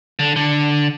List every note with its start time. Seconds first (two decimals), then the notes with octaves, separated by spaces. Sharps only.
0.19 D3
0.36 D3